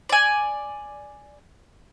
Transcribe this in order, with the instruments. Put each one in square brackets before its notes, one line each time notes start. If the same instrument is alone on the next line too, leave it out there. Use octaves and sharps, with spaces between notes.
[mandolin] D5 G#5